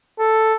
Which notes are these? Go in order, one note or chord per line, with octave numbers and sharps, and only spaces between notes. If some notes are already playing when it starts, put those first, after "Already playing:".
A4